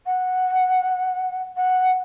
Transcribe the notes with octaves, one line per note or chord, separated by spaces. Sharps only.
F#5
F#5